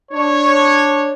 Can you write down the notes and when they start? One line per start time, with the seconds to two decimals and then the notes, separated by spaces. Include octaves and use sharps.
0.12 D4 C#5